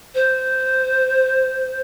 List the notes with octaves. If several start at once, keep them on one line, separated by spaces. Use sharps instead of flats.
C5